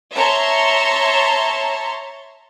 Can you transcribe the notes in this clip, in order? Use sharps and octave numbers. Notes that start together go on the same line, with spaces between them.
C#5 E5 A5 A#5 C6